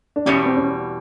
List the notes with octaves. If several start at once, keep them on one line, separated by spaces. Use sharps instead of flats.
D4
E2 B2 G3 C#4
C4
C#4